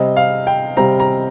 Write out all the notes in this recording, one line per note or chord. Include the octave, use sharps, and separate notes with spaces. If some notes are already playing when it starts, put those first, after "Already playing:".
Already playing: C3 G3 C4 D#5
F5
G5
C3 G3 C4 A#5
A#5